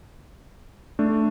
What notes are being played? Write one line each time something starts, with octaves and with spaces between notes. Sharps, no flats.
A3 D4